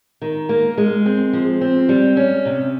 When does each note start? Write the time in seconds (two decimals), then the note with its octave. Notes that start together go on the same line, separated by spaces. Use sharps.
0.22 D#3
0.49 A#3
0.78 G#3
1.06 C4
1.33 F3
1.61 C4
1.89 G3
2.17 C#4
2.45 C3